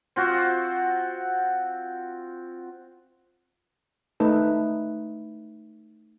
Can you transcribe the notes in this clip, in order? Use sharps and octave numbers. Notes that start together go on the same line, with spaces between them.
C4 F4 F#4
A3 D#4 B4